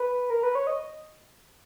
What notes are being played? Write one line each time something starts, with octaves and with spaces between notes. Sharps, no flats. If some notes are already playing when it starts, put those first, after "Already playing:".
Already playing: B4
A#4
B4
C#5
D#5